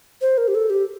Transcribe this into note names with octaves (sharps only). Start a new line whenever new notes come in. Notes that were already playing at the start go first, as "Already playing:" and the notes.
C5
A#4
G4
A4
G4